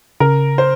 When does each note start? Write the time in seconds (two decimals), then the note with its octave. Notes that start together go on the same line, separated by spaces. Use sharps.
0.20 C#3 A#4
0.58 C5